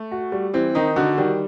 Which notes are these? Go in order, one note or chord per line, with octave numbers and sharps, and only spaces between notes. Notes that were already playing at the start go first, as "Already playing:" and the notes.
Already playing: A3
F#4
G3
E3 C4
D#3 D#4
D3 F#4
D#3 G3